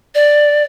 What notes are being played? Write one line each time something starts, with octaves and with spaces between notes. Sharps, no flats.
D5